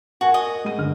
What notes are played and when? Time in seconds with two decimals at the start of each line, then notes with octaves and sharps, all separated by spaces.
0.21 F#4 A#4 G#5
0.34 D#5
0.64 G#3 D#7
0.78 G1 F6